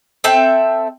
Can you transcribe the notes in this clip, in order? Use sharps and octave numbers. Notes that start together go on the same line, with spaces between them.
C4 A4 E5 G5